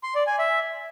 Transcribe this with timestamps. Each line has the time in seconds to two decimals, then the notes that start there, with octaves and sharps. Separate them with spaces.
0.03 C6
0.15 D5
0.27 G#5
0.39 E5